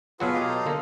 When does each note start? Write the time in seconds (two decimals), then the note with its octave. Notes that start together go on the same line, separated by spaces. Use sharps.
0.20 B2 F#3 F4 F#4 G#4 A4 B4
0.34 G4 D#5 F5
0.46 D#4 A4
0.66 D3 A#3